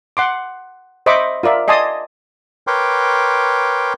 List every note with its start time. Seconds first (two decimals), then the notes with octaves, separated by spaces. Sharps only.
0.17 F#5 C6 D6
1.06 C5 D#5 E5 B5 C#6 D6
1.43 F4 A#4 D5 E5
1.68 D5 D#5 G#5 A5 C6 D#6
2.67 A#4 B4 C#5 G5 C6 D6